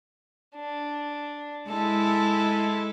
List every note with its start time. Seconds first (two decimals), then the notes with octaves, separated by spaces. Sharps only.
0.56 D4
1.69 G#3 E4 A4